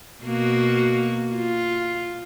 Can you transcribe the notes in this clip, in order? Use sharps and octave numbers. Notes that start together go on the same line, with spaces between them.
B2 A#3 F#4
F4